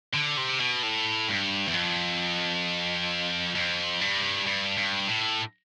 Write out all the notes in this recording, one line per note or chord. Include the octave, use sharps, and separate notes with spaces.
D3
C3
B2
A2
G2
E2
F2
F2
G2
G2
G2
A2